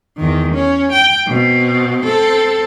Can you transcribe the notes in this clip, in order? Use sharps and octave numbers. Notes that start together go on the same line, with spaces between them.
E2 D#3
C#4
G5
B2 C4
C4 A4